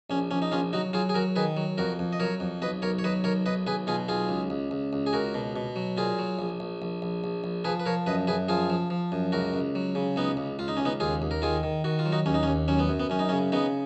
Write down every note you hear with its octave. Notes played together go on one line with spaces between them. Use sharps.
A#1 C#4
A#1 C#4
D#4
A#1 C#4 F4
F#3 D#4 F#4
F#3 F4 G#4
G#4
F#3 F#4 A#4
D#3 G#4 B4
F#3
F2 F#4 A#4
F2
D#5
F#3 A#4 C#5
F2
B1 B4 D#5
B1 A#4 C#5
C#5
F#3 B4 D#5
B1 A#4 C#5
B1 B4 D#5
B1 G#4 B4
B2 F4 G#4
B1 F4 G#4
C#2
C#2
C#2
C#2
G#4
C#2 F#4 A#4
B2
B2
F#3
A#2 F4 G#4
F#3
A#1
A#1
A#1
A#1
A#1
A#1
F3 G#4 B4
B4
F3 A#4 C#5
F#2 B4 D#5
F#2 G#4 B4
F3 F4 G#4
F3
F3
F#2
C#2 F#4 A#4
C#2
F#3
C#3
C#2 B3 D#4
C#2
C#2 F4
D#4
C#2 C#4
B3 D#4
D#2 F4 G#4
D#2
A#4
D#3 F4 G#4
D#3
D#3 F#4
F4
F#3
D#4 F#4
D#2 C#4
D#4
C#4
D#2
F#3 C#4
B3
F#2
B3
F#2 C#4
D#4
C#4
C#3
C#3 B3 D#4